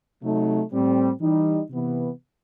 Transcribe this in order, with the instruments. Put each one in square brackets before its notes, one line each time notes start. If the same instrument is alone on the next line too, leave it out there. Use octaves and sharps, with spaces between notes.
[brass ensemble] C3 F#3 A3 D#4
A2 G3 C4
E3 G3 D#4
C3 E3 B3